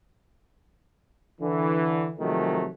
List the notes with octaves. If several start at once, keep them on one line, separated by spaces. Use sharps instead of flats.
D3 E3
C3 D#3 F3 F#3 G#3 A3